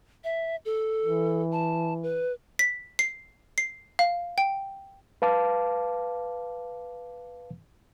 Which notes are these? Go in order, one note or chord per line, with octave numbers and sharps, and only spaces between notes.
E5
A4
E3
A5
B4
B6
C7
C7
F5
G5
B4 F5 A5 D6